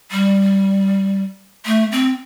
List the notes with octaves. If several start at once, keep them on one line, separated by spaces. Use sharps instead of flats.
G3
A3
C4